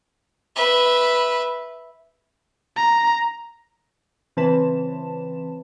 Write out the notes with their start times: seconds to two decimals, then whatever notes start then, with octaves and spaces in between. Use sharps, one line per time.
0.56 B4 E5
2.76 A#5
4.37 C#3 E3 C4 B4 A5 E7